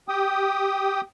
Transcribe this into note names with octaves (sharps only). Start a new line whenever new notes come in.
G4 G5 D#6